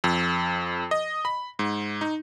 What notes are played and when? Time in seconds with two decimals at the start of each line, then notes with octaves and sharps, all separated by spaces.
0.04 F2
0.91 D#5
1.25 B5
1.59 G#2
2.01 D#4